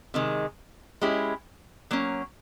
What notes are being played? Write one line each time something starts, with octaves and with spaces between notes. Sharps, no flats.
C3 D#3 G#3
G#3 C#4 E4 G4
F#3 A#3 C#4